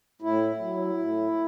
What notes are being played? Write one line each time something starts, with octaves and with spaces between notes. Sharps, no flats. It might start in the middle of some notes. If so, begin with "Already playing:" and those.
A2 E4
F#3
A2